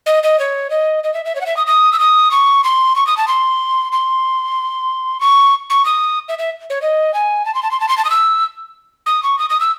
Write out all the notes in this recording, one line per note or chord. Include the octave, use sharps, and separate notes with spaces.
D#5
D#5
C#5
D#5
D#5
E5
E5
C#5
F#5
E5
D#6
D#6
E6
D#6
C#6
C6
C#6
D#6
A5
C6
C6
C#6
C#6
D#6
E5
E5
C#5
D#5
G#5
A5
C6
A5
C6
A5
C6
A5
D#6
E6
D#6
C#6
D#6
D#6
E6